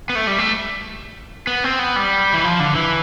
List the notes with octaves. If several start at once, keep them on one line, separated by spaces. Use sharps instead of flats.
B3
A3
G3
A3
B3
C4
B3
G3
E3
F3
D3
E3